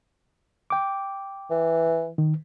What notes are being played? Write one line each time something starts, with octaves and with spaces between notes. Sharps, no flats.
G5 D6
E3
D#3